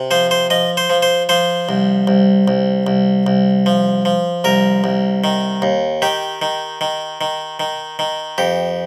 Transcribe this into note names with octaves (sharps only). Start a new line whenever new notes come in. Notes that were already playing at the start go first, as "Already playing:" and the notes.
Already playing: C3
F3 C5
C5
F3 D#5
C5
F3
C5
F3 C5
C2
C2
C2
C2
C2
F3
F3
C2 A#4
C2
D#3
D#2
D#3 G4
D#3
D#3
D#3
D#3
D#3
F2 G4